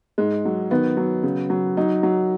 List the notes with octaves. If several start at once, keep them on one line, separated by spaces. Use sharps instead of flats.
G#2 G#3
F#3
D#3 B3
F#3
C#3
F#3
F#3 D#4
F#3